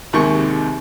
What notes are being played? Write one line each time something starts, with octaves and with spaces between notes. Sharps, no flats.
D#2 G#2 C3 D#3 C#6